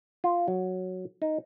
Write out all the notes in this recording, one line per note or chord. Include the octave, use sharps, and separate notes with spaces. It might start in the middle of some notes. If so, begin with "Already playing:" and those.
F4
F#3
D#4